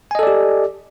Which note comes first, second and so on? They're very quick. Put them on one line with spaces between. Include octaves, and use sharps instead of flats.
G#5 D#5 A4 D5 G4